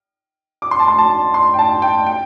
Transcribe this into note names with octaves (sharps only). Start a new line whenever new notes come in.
D6
C6
A5
C6
A5
C6
G5
A5
G5
G5